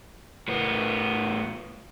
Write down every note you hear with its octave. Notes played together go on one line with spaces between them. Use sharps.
A2 B3